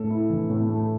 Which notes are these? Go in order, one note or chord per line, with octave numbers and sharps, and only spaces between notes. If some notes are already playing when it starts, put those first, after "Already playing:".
Already playing: A2 A3 A4
E4
E3
A2
A3